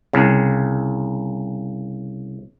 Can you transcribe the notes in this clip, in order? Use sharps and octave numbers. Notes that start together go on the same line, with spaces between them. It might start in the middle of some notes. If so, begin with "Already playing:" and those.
C2 C#3